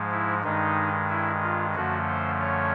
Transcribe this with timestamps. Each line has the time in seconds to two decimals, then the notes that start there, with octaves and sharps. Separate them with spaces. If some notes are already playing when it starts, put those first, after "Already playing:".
Already playing: G#2 F3 G#3
0.11 E4
0.44 G2 D#3 G#3 D#4
1.09 E4
1.42 F4
1.75 F#2 D3 F3 A3 C#4 F#4
2.08 C5
2.41 C#5